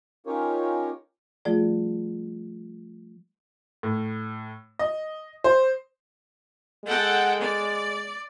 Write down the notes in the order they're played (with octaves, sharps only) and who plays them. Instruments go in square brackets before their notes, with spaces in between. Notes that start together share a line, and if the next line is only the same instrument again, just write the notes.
[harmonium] C#4 D#4 F4 G4 A#4 C#5
[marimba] F3 G3 A3 F4 G#4 D5
[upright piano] A2
D#5
C5
[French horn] G#3 [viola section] A4 F#5 G5
[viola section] D5